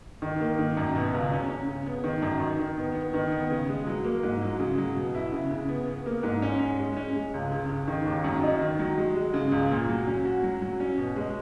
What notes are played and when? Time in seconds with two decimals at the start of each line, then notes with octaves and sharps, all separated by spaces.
0.22 D#3
0.40 A#3
0.59 D#3
0.77 F#2
0.95 B2
1.13 C#2
1.31 C#4
1.49 C#4
1.68 C#3
1.86 B3
2.04 D#3
2.22 F#2
2.40 D#3
2.59 D#3
2.77 B3
2.95 B3
3.14 D#3
3.32 B3
3.50 C#3
3.69 G#3
3.87 F#3
4.05 A#3
4.23 G#2
4.42 F#3
4.59 C#3
4.78 F#3
4.96 B2
5.15 E4
5.32 C#3
5.51 C#3
5.69 B3
5.87 B3
6.06 A#3
6.23 G#2
6.42 C#4
6.60 C#4
6.78 G#3
6.97 C#4
7.15 G#3
7.34 C#2
7.52 C#3
7.69 C#3
7.87 D#3
8.06 D#2
8.24 F#2
8.43 D#4
8.61 D#3
8.79 F#3
8.97 G#3
9.15 G#3
9.34 C#3
9.52 C#2
9.71 A#2
9.89 F#3
10.07 C#4
10.25 F#4
10.43 F#3
10.62 F#3
10.80 C#4
10.98 B2
11.16 G#3